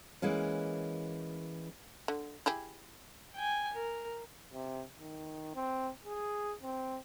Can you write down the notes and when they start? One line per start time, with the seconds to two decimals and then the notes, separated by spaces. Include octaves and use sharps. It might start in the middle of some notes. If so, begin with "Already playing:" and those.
0.22 E3 G#3 A#3 C#4
2.08 D3
2.46 E4 G4 G#4
3.34 G5 G#5
3.74 A#4
4.53 C3
5.00 D#3
5.55 C4
6.05 G#4
6.63 C4